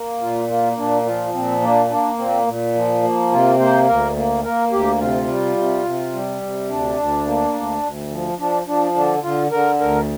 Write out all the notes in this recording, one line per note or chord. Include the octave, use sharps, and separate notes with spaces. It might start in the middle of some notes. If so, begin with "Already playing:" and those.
Already playing: A#3
A#2 F4
A#3 F4
A#2 D4
F3 F4
A#2 C4
A#3 D4
A#3 D4
A#2 C4
A#2
F3
A#3
C3 F4
A#3 C5
D2 A#4
A#3
A#3 A#4
D2 G4
C3 F4
G3
C3
C3
G3
C3
D2 D4
D2
A#3
D2
D2
F3
F3 D4
F3 D4
D3 D4
D3 F4
D3 A#4
D2 A#4